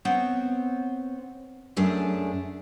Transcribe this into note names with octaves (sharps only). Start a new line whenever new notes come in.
B3 C4 C5 C#5
F#2 A3 D4 G#4